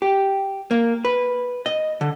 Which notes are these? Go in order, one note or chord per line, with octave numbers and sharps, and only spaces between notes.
G4
A#3
B4
D#5
D3